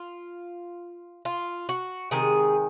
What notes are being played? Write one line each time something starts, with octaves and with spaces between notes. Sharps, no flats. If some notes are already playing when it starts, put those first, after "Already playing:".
Already playing: F4
F4
F#4
C3 D#3 G#3 G#4